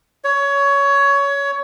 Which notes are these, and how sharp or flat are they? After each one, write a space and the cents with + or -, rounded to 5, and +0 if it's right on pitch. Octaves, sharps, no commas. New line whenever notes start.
C#5 +20